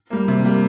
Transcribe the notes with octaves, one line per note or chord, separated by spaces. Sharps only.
G3 A#3
C3
G3 A#3